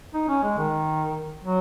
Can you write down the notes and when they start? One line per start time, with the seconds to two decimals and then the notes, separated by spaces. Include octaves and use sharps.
0.14 D#4
0.28 C#4
0.43 G#3
0.57 D#3
1.44 F#3